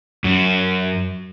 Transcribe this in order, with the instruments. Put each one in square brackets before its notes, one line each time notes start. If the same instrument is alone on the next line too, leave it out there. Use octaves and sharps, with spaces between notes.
[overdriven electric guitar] F#2